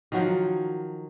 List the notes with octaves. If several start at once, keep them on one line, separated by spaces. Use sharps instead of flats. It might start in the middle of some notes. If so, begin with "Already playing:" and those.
D#3 F3 F#3 F#4